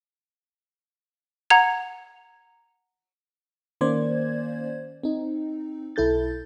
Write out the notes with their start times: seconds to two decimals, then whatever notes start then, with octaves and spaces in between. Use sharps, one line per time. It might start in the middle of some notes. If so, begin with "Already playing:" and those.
1.50 F#5 A#5 G#6 F7
3.81 D#3 A#3 C#4 C5 D5 G#6
5.03 C4 D#4
5.96 B1 E4 A4 G6 A6